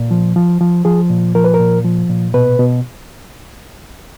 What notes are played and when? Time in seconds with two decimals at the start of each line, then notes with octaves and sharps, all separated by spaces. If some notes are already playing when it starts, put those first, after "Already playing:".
Already playing: A#2
0.11 F3
0.36 F3
0.61 F3
0.85 F3 G#4
1.10 A#2
1.35 F3 A#4
1.44 B4
1.54 A#4
1.60 A#2
1.84 F3
2.10 A#2
2.34 B2 B4
2.59 B2